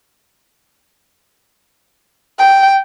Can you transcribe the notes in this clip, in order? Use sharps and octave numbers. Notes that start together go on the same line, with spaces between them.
G5